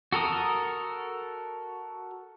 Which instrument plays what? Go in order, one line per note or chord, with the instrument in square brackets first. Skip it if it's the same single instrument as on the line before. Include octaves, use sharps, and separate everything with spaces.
[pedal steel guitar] F#4 A4 A#4 D#6